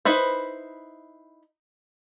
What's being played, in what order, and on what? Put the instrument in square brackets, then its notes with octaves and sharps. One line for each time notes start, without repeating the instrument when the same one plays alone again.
[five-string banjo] D#4 E4 B4 C5